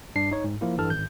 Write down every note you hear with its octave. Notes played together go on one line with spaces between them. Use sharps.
G2 D4 C7
D#4 C#5
G#2
F3 A#3 E4
G2 E3 G3 A4 A5 F6
G#1 G6